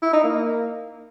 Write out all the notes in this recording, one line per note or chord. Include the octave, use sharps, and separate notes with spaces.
E4
D#4
A#3